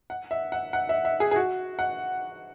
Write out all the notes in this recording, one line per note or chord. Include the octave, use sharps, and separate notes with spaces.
F#5
E5
F#5
F#5
E5
E5
G#4
G#4
F#4
F#5